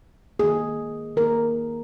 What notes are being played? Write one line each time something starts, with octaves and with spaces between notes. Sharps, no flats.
D#3 A#3 G#4
D#3 A#3 A#4